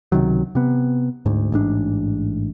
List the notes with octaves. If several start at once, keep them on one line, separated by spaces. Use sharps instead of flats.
C#2 C3 D#3 F#3
C3 B3
D2 G#2
A1 G#2 D4